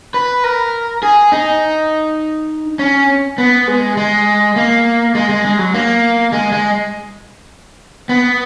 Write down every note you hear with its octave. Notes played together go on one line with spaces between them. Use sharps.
B4
A#4
G#4
D#4
C#4
B3
G#3
G#3
A#3
G#3
G#3
G#3
F#3
A#3
G#3
G#3
B3